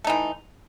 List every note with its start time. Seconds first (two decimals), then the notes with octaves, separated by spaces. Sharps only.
0.04 A3
0.07 D#4
0.10 E3